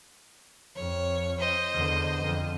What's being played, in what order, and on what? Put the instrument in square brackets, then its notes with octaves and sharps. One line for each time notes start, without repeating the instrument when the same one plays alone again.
[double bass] F2 [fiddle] C#5
[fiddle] C5 D#5
[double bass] E2 D3
F2 D3